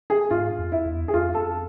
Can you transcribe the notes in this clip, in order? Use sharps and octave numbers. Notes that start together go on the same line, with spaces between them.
G#4
G#2 F4
F2
E4
E2
G#4
F2 F4
A4